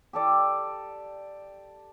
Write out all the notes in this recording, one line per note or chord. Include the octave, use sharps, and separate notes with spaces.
G4 A4 D5